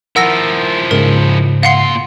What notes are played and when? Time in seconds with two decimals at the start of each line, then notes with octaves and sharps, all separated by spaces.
0.16 F3 E4 A#4 F#5 E6 A#6
0.91 G#2 C#3 G#3 A#4
1.63 A#2 F5 F#5 C6 C7